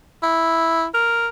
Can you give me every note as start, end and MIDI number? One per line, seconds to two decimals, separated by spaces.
0.23 0.85 64
0.94 1.28 70